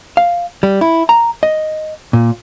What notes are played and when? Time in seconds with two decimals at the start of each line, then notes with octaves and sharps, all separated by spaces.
0.17 F5
0.63 G3
0.81 E4
1.09 A#5
1.43 D#5
2.13 A#2